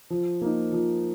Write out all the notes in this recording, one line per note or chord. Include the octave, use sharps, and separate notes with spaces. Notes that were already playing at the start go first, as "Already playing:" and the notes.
F3
A#3 D#4
F3